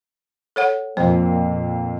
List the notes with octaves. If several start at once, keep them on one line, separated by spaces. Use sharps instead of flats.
A4 C#5 F#5
F2 A#2 C5
A#2